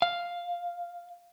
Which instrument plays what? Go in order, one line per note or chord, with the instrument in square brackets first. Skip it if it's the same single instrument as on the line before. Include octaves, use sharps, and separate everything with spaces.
[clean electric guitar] F5